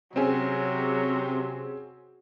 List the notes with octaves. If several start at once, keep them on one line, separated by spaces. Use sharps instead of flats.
C3 F#3 C4 C#4 G#4